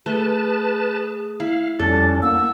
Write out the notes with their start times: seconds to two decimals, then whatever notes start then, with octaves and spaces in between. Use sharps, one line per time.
0.06 A3 G#4 B4 A5
1.40 E4 F5
1.79 F2 G3 C#4 D4 A4 A6
2.22 A#3 F#5 E6